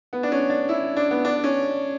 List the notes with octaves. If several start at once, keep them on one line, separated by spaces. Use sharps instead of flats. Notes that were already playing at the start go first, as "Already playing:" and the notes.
B3
D4
C#4
D4
E4
D4
B3
D4
C#4